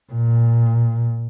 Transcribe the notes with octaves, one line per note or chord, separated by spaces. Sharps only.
A#2